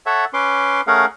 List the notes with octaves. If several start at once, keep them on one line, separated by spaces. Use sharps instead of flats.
A4 C#5 E5 F#5
C#4 B4 C6 D6
A3 C#4 G#4 A#4 F5 F#5